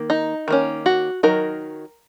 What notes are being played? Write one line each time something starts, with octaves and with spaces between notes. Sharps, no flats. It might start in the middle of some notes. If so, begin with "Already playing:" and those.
Already playing: D#3 A#3
D#4
D#3 A#3 C#4
F#4
D#3 F#3 D#4 A#4